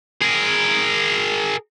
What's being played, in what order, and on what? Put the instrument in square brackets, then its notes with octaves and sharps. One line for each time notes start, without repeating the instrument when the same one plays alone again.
[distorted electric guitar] G#4 A#4